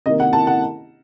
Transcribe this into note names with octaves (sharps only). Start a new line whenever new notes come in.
C3 D#3 A#3 D#5
F#5
A5
F#5